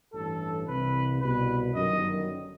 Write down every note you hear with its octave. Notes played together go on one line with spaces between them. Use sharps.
A1 G2 E3 A4
C2 C3 E3 B4
C2 B2 B4
G1 F#2 D#3 D#5